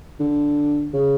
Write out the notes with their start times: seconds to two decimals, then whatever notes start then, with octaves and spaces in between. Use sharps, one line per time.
0.20 D3
0.93 C#3